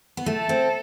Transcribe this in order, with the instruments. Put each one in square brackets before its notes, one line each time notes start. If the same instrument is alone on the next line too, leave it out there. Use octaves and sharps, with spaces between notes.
[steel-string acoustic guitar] B3
[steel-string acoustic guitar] A3 [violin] A4
[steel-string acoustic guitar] C4